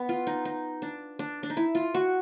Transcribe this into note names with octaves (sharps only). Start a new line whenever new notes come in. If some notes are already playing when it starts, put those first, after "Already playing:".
Already playing: B3
F4
D#4
D#4
D4
D4
D4
D#4
E4
F4
F#4